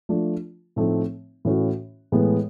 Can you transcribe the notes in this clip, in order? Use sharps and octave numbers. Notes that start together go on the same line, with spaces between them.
F3 A3 D4 F4
A2 F3 A3 C4 D#4
A2 E3 A3 C#4 F#4
A2 E3 G#3 B3